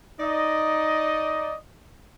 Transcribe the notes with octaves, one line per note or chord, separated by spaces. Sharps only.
D#4 D5 D#5